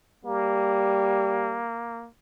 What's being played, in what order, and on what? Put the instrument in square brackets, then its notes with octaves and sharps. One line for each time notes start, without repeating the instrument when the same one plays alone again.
[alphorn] G3 [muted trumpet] A#3